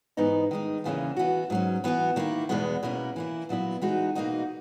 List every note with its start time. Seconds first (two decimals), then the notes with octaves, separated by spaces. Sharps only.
0.17 G#2 E3 B3 D#4
0.51 D#3 G#3 D#4
0.84 E2 C#3 E3 A#3 C#4
1.16 E3 B3 F#4
1.50 G#2 F#3 C#4
1.84 E3 B3 F#4
2.16 D#3 A#3 E4
2.49 E2 B2 G#3 B3
2.83 B2 A#3 C#4 E4
3.16 E3 A#3 E4
3.49 A#2 F#3 B3 E4
3.82 E3 G#3 D#4 F#4
4.15 B2 A#3 D#4 F#4